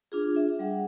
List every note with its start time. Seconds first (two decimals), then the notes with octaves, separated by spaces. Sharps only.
0.12 D4 F4 G#4
0.36 E5
0.59 G3 G#4 F#5